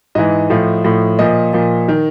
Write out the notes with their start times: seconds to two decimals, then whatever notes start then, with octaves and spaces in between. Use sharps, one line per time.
0.15 G#2 E3 D#5
0.50 A2 F3
0.84 A2 F3
1.19 A#2 F3 D#5
1.53 A#2 F3
1.88 D#3